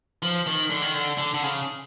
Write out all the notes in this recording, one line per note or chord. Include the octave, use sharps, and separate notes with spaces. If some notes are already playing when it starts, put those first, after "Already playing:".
F3
D#3
D3
D#3
D3
D3
D3
C#3